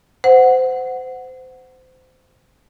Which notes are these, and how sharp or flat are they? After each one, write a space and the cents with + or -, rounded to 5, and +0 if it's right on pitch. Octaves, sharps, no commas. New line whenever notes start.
C5 -25 F#5 +0